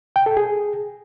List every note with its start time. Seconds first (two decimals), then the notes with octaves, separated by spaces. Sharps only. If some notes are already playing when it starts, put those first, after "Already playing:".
0.16 G5
0.26 A4
0.37 G#4